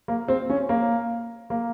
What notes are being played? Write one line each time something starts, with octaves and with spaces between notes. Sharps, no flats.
A#3
C4
C#4
A#3
A#3